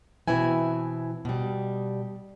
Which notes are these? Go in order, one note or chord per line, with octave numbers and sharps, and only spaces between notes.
B2 E3 C4 E4 G#5
B2 G3